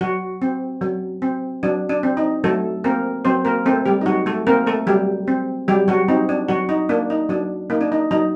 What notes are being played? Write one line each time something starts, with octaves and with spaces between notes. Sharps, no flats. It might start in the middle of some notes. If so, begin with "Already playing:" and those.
F#3 F#4
C4
F#3
C4
F#3 D4
D4
C4
D#4
F#3 A3 A4
A#3 C4 A#4
F#3 C4 C5
A#3 A#4
A3 C4 A4
G3 G4
D#4
F#3 F#4
A3 A4
A#3 C4 A#4
A3 A4
F#3 G3 G4
C4
F#3 G3 G4
F#3 F#4
C4 D#4
D4
F#3 F#4
D#4
A#3 D4
D#4
F#3 D4
A#3 D#4
D4
D#4
F#3 D#4